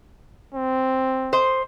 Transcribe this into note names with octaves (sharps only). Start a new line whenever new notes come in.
C4
C5 D#5